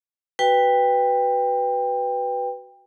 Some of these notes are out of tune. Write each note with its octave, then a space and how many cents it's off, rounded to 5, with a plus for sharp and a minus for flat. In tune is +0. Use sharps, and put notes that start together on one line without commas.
F#4 +15 B4 +0 G5 +20